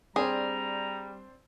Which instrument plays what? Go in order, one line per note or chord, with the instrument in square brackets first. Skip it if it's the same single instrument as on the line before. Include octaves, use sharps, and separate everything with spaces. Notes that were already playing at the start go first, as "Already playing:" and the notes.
[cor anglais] G3 [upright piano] C4 D4 C5 [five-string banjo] G#4 [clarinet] A#5